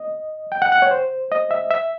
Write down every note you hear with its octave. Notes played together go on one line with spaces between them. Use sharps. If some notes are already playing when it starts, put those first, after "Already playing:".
Already playing: D#5
G5
F#5
F#5
C#5
C5
D#5
E5
E5